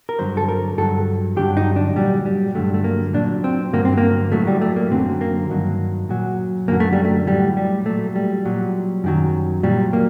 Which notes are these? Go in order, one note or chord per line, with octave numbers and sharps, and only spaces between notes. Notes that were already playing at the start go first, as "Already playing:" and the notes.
A#4
G2 D3 F#3 C5
A4
A#4
G2 F#3 A4
G2 D3 F#3 G4
D#4
D4
A#2 F#3 G3
G3
G2 D3 F#3 A3
A3
A#3
A#2 F#3 D4
C4
G2 D3 F#3 A#3
C4
A#3
A2 F#3 A3
G3
A3
A#3
F#2 D3 F#3 C4
A#3
G2 D#3 F#3
A#2 F#3
F#2 D3 F#3 A#3
A3
G3
A3
A2 F#3 G3
G3
A#2 F#3 A3
G3
A#2 F#3
F#2 D#3 F#3
A#2 F#3 G3
A#3